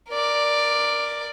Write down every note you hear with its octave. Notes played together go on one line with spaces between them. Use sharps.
A#4 D5